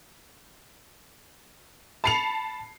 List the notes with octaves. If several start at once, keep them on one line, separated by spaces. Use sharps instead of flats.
A5 B5 C7 C#7 F7